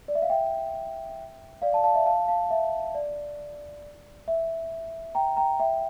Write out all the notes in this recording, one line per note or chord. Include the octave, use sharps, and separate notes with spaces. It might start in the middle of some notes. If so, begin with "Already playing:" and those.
D5
E5
F5
E5 G5
D5 F5
F5 A5
F5 A5
E5
F5 A5
F5 A5
E5
D5
E5
G5 A#5
G5 A#5
E5 G5